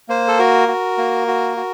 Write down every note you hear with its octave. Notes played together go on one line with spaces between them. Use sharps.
A#3 C5
A4
F#4 A#4
F#4
A#3
F#4
F#4